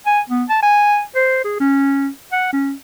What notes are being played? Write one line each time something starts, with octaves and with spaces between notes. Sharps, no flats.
G#5
B3
A5
G#5
C5
G#4
C#4
F#5
C#4